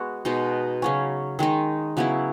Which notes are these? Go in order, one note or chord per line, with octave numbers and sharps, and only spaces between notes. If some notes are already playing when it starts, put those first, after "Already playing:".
Already playing: G#3 B3 F#4
B2 G#3 D#4
C#3 F#3 C#4
D#3 G#3 D#4
C#3 F#3 B3 E4